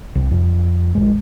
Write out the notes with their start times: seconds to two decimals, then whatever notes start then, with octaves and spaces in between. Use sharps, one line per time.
0.15 C2
0.31 F2
0.95 A#1 E2 G#3